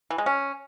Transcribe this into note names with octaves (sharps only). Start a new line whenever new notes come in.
E3
G#3
C#4